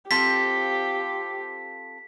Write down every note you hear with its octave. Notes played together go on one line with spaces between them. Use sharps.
C4 F4 G4 A4 B6